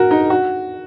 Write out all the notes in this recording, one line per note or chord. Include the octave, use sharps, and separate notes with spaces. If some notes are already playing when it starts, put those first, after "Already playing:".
Already playing: F#4 A#4
D#4
F#4